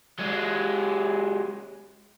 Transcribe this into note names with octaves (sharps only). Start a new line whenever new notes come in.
F#3 G#3